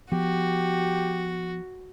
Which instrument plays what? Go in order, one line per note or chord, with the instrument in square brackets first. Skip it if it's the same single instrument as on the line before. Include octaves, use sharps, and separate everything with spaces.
[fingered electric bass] F3 B3 [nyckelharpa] F#4 [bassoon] G4